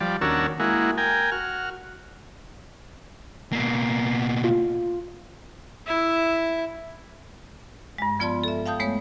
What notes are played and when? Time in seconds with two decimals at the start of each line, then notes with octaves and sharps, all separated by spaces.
0.01 F3 G3 D5
0.21 D#2 C#4 D4 F#4 A#4 E6
0.60 G#3 A#3 E4 F#4
0.98 A#4 G5 G#5
1.32 F#4 F6
3.53 B2 A#3 C7
4.44 F4
5.87 E4 E5
7.98 G2 G#3
8.19 F3 B3 F4 D5 A5 C6
8.44 A4 E5
8.66 F5 G5 A5 D#6 G6
8.80 G#3 A3 B3 C#5